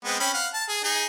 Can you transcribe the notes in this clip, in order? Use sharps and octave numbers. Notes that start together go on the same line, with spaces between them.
G#3 B3 C4
C4 C#4 B5
F5 F#5
A5
G#4
D#4 G#4